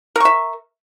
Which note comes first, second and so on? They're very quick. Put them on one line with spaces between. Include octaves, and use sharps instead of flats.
A#4 C#6 E5